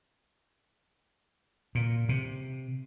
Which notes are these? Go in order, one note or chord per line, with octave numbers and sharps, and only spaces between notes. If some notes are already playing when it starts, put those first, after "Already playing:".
A#2
C3